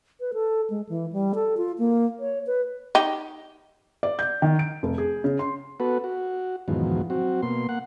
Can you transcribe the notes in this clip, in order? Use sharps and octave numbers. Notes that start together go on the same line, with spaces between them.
B4
A4
G#3
E3
G3
A4
F4
A#3
C#5
B4
D#4 G4
D5
G6
D#3
D7
F1
G#4
C#3
C6
B3 F#4 A4 B4
F#4
E2 G#2 B2 D#3 F3 F#3
F#3 C4 F#4
B2 A#3 C6
A#3 F#5